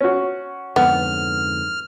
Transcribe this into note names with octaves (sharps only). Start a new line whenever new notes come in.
C#4 F#4
F2 G#2 D3 B3 F6